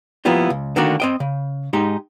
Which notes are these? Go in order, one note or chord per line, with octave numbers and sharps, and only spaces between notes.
F3 A#3 B3 E4 F4 G4
C#2
D3 D#3 A3 A#3 D4 F#4
C4 D#5 G5
C#3
G#2 G#3 D#4 G4